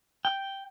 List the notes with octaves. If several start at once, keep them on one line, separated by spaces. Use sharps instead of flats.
G5